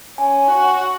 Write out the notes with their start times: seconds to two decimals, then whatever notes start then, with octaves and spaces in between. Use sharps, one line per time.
0.18 C#4 G#5
0.49 F#4
0.64 F#5